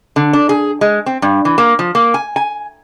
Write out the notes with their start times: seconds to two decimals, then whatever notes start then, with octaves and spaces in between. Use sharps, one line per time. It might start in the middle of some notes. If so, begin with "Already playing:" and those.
0.16 D3
0.33 D4
0.49 G#4
0.81 G#3
1.06 C4
1.22 G2
1.45 E3
1.58 A#3
1.79 F3
1.95 A#3
2.14 G#5
2.36 G#5